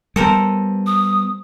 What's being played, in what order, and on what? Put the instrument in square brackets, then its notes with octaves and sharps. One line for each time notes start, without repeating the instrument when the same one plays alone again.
[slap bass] G3 B3 [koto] A4 A#4 C5
[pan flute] D#6